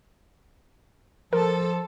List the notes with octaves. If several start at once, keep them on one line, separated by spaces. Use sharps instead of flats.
F3 A4 A#4